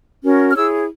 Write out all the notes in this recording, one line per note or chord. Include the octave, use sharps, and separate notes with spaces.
C#4 F#4 A#4
F6
E4 G#4 C#5 E6